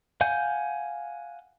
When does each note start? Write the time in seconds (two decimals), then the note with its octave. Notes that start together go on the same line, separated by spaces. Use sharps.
0.21 F5 F#5 G#5 G6